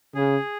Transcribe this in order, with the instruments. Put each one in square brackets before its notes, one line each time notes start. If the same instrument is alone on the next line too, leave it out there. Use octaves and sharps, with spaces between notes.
[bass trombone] C#3 [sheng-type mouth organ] G#4